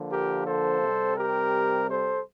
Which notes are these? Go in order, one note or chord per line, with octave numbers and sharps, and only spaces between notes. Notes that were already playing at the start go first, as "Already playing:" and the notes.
Already playing: D3 F3 A#3
G4 A#4
A4 C5
C3 G3 C4
G4 A#4
A4 C5